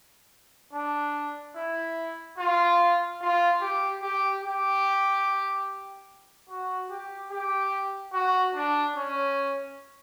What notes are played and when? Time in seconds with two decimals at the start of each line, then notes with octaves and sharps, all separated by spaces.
0.73 D4
1.56 E4
2.39 F4
3.21 F4
3.62 G4
4.02 G4
4.44 G4
6.50 F#4
6.90 G4
7.31 G4
8.13 F#4
8.55 D4
8.95 C#4